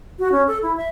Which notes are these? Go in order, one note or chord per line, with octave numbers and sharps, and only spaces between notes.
F#4
C#4
A4
E4
E5